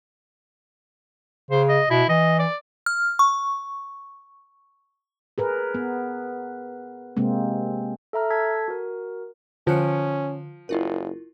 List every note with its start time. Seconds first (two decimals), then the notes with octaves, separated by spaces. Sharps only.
1.51 C#3 C5
1.69 D#5
1.90 B2 E4
2.09 E3 D#5
2.39 D5
2.86 F6
3.19 C#6
5.38 G#4 A#4 B4
5.75 B3
7.17 C3 G#3 A#3 C4
8.13 A4 E5 A#5 F6
8.30 A4 A5 E6 G#6 B6
8.68 F#4 A#4
9.67 D3 F3 C#4 F#6 C#7
10.69 F#1 E4 F4 A#4